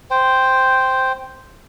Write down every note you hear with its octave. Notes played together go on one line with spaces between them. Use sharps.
C5 G5